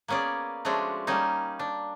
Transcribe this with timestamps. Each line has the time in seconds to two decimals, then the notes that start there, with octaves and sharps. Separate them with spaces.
0.08 A#3 B3 C#4 G#4 D5
0.65 F3 G#3 A3 C#4 D4 F#4
1.07 G3 A#3 C#4 D#4
1.59 D4